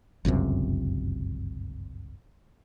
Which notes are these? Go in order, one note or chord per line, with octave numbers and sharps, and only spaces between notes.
G1 C#2 F#2 C3